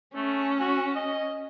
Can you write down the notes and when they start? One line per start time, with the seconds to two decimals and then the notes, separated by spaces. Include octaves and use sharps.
0.15 A3 C#4
0.60 F#4
0.96 D#5